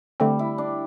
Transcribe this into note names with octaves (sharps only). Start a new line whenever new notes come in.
D3 G3 A3 C4
E4
D4